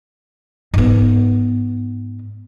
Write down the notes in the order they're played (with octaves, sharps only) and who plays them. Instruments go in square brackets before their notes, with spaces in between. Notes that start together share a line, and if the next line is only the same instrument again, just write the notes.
[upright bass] G#2 B3